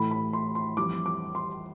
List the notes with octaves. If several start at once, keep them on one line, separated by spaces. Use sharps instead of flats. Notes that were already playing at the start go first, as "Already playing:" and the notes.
Already playing: A2 E3 A3 B5
B5
C6
C6
F2 E3 G3 D6
D6
C6